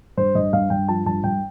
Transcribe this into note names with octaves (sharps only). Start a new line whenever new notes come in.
G2 C5
G2 D#5
G2 F5
G2 G5
F3 A5
G2 A5
G2 G5